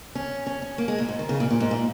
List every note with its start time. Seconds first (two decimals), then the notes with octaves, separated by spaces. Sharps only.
0.15 C#4
0.47 C#4
0.62 C#4
0.78 A#3
0.88 G#3
0.99 A#2
1.09 G#2
1.19 D#3
1.29 C#3
1.40 A#2
1.51 A#2
1.60 G#2
1.71 A#2